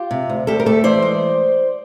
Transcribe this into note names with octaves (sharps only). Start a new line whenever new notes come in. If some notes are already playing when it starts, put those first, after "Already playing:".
Already playing: F4 G4
C3
D2
D2 G4 A4
A#4
A3 G4 A4
E3 C5 D5
G#3